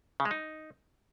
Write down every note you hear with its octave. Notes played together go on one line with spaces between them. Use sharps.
C#3
G#3
D#4